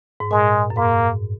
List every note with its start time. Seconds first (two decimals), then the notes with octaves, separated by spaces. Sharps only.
0.20 G#2
0.31 A#2 G#3
0.70 F#2
0.77 G#2 A#3